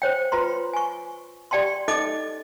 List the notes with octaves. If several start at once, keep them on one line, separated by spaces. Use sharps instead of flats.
C5 C#5 G5
F4 B4 A#5 C6
G#5 C#6
G4 D5 G5 A5 C6
D#4 A4 D#5 D6